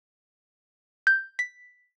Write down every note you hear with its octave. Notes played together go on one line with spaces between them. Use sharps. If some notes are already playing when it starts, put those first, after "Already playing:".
G6
B6